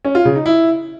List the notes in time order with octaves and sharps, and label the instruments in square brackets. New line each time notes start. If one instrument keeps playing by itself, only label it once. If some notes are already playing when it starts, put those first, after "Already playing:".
[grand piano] C#4
F4
C#3
D#4
E4